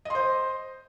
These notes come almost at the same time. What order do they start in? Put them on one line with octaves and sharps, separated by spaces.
D#5 C6 C5